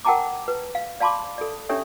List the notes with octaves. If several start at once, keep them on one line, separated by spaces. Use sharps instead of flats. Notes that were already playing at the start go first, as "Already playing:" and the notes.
A#4 F#5 G5 A5 A#5 D6
B4
F5
D5 F5 A5 B5 C6 D6
A4 D5
C#4 D4 G4 A4 C#5 E5